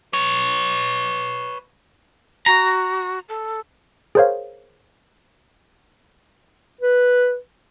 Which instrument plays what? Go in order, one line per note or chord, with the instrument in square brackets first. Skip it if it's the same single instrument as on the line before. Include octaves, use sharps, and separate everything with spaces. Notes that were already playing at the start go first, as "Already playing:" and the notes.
[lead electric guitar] B4 C#5
[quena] F#4 [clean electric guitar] A#5
[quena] A4
[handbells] G#4 A#4 C5 C#5 F5
[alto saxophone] B4